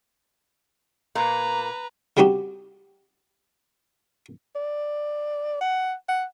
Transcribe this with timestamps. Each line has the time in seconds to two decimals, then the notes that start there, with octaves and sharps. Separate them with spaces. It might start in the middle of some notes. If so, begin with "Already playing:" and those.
1.15 A#2 A#3 B4 A#5
2.17 C#3 G3 C4 D#4 F#4 G4
4.56 D5
5.61 F#5
6.09 F#5